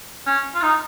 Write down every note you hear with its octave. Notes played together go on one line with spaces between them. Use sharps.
C#4
F4
D#4